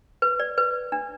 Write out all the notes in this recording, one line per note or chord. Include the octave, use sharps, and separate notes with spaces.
B4
D5
B4
D4